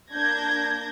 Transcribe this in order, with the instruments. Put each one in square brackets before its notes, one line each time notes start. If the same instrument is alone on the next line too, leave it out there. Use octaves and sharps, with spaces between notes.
[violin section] A#3 D4 G6 G#6 A#6